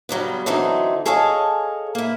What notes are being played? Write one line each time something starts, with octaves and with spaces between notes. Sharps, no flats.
C#3 F#3 G3 B3
D3 E3 F#3 C4 D#4
G#4 A4 C#5 D#5 F5 G#5
A#3 E4